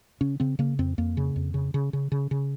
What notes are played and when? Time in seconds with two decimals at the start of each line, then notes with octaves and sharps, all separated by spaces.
0.21 C#3 C#4
0.40 C#3 C4
0.59 C#3 A#3
0.79 F2 C4
0.98 F2 A#3
1.17 C#3
1.36 F2
1.54 C#3
1.74 C#3
1.93 C#3
2.12 C#3
2.31 C#3